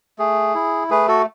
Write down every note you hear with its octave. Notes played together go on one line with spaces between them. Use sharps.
A3 G#4
E4
A3 G#4 B4
F#4 A4